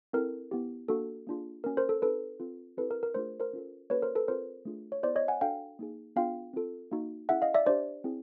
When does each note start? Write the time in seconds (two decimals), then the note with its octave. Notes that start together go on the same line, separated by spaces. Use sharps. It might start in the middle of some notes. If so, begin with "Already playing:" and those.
0.13 C4 E4 A4 A#4
0.51 B3 E4 G4
0.89 A#3 D4 F#4 A4
1.27 A#3 D4 F4 G#4
1.64 A#3 C#4 F#4 A#4
1.77 A#4 C5
1.89 A4
2.02 C4 D#4 G4 A4 B4
2.40 C4 F4 A4
2.77 C4 E4 G4 A4 B4
2.91 A#4
3.03 A#4
3.15 A3 D4 F4 G#4 A#4 C5
3.40 A#4 C5
3.53 C#4 F4 A4
3.90 A#3 C#4 F#4 A4 B4 C#5
4.02 A#4 C5
4.15 A4 B4
4.28 C4 F4 A4 A#4 C5
4.65 A3 D4 F4 G#4
4.92 C#5
5.03 B3 E4 G#4 C5 D5
5.16 C#5 D#5
5.28 F#5 G#5
5.41 D4 F#4 A4 F5 G5
5.79 A#3 D#4 G#4
6.16 B3 D4 F4 G#4 F5 G5
6.54 C4 F4 A4
6.92 A#3 D#4 F#4
7.29 C#4 E4 G#4 E5 F#5
7.42 D#5 F5
7.54 D5 E5
7.67 D4 G4 C5 D5
8.04 C4 E4 G#4